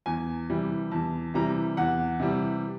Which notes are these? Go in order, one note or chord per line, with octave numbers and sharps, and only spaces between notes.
E2 G#5
C3 E3 G3
E2 A5
C3 E3 G3 A#5
E2 F#5
C3 E3 G3